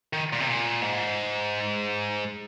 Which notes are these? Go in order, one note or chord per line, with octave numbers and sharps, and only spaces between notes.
D#3
A#2
C3
A#2
G#2